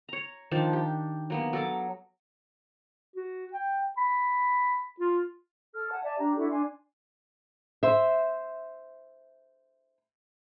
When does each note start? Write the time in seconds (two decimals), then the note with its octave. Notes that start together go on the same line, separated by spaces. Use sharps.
0.09 C#5 A#5
0.51 D#3 F3 D4 D5
0.73 G4
1.30 F#3 A#3 B3
1.53 F#3 A4 D6
3.16 F#4
3.53 G5
3.98 B5
5.00 F4
5.74 A4 F6
5.91 F#5 G#5 A5
6.04 D5 E5 G#5 A5
6.18 D4 G4 A#5
6.37 D4 E4 F#4 A4
6.51 D4 G#5 C6
7.83 C5 E5